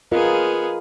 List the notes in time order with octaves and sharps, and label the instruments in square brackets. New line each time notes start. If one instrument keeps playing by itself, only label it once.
[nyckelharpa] B3 G#4 [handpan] F4 A#4 D#5